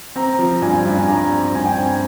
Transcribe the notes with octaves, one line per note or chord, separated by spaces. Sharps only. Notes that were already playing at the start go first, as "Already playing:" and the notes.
C4 A#5
F3
G2 G#5
G2
G#5
G2 A#5
C4
G2 G#5
G5
C4 G#5